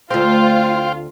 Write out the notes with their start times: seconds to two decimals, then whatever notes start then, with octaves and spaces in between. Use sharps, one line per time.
0.10 D2 A3 C4 F4 C5 F5 G5